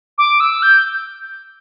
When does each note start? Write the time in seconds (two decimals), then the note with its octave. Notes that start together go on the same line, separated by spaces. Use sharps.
0.18 D6
0.40 E6
0.63 G6